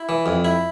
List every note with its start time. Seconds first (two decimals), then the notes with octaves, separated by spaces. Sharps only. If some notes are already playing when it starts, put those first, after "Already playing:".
Already playing: E4
0.09 E3
0.26 F2
0.45 E4